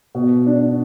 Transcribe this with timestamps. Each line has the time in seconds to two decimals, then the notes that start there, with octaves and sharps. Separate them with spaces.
0.15 B2
0.46 D4